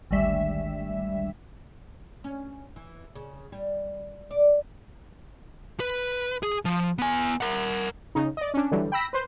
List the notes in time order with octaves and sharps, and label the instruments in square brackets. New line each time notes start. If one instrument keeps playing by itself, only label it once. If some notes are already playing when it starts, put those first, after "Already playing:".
[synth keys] G#1 D2 G3 E5
[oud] C#4
E3
C#3
G3
D5
[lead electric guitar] B4
G#4
F3
B3 G#5
A#4 F#5
[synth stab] C#3 D#4
D5 D#5
C#4 D4
D3 E3 F#3 G3
G5 B5 E6 A#6 B6
B4 C5